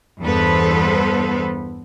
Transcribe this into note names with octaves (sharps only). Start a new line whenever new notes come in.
E2 G2 B3 A4 B4 C5